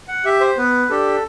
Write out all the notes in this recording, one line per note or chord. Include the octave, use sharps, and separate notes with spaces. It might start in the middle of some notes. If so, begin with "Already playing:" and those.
F#5
G4 E5
C5
B3 B4
D4 G4 A4